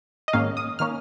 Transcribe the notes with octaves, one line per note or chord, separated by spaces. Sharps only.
D#5
G#2 D#3 A#3 C#4 F5
D#6
D#3 A#3 C#4 F6